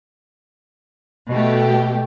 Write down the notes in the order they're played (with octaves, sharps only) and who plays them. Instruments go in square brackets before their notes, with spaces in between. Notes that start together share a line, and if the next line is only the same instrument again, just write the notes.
[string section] B2 A3 G4